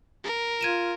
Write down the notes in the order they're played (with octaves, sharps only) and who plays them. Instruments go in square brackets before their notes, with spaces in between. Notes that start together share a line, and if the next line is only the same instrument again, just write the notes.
[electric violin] A#4
[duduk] F4 [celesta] G#6 D#7 E7